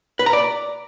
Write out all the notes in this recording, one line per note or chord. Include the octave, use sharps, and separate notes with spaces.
B4
A#5
D5